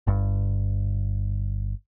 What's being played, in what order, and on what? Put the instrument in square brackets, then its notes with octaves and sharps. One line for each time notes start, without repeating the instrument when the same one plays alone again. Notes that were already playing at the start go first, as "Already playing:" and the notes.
[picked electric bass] G1 G2